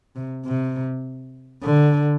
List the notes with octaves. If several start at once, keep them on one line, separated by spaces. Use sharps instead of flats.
C3
C3
D3